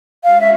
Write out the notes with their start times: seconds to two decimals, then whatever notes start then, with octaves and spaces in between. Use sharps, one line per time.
0.23 G#3 C#4 F#4 F5
0.41 E5